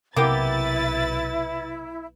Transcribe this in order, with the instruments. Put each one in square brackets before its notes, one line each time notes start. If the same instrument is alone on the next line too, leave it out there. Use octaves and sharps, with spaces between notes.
[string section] B1 B4 A6 [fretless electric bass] C3 [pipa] A#3 B3 G4 [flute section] E4